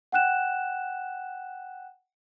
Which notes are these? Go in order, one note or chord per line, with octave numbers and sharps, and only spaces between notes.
F#5 G5 F#6 E7